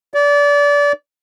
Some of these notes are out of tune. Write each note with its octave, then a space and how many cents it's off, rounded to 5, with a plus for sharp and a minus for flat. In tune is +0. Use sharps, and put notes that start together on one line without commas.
D5 -30